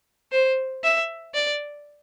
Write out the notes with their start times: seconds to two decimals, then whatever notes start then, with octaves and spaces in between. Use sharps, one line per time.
0.32 C5
0.84 E5
1.34 D5